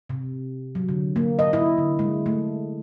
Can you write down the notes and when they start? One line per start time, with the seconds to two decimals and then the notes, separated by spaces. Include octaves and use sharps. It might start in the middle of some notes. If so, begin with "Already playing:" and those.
0.10 C3
0.75 F#3
0.89 D3
1.16 A#3
1.39 D#5
1.53 E4
1.78 D3
1.99 G#3
2.26 A3